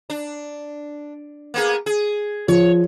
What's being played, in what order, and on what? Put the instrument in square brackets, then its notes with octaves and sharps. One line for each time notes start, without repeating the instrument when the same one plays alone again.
[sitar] D4
A#3 B3 G#4
G#4
[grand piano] F3 [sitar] C#5